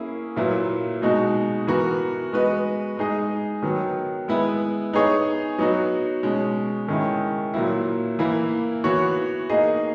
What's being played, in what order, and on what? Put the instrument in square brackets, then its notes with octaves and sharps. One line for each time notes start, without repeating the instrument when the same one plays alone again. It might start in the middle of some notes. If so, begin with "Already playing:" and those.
Already playing: [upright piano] A#3 C#4 E4 G#4
A#2 F#3 A#3 E4 B4
B2 G#3 D#4 F#4
E3 B3 F#4 A#4
G#3 B3 F#4 B4 D#5
G#3 D#4 G#4 D#5
D#3 F#3 B3
G#3 B3 E4 B4
B3 D#4 G#4 C#5
F#3 B3 D#4 F#4
B2 G#3 C#4
D#3 G#3 C#4 E4
A#2 F#3 A#3 E4
E3 A#3 E4
E3 B3 F#4 C#5
A#3 D#4 G#4 D#5